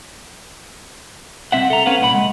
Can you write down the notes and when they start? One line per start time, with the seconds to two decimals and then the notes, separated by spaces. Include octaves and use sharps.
1.52 C2 C4 E5 F#5
1.70 A4 A#5
1.86 C4 C#4 B4 F5 F#5
2.01 C2 A#2 F#5 B5
2.14 G#3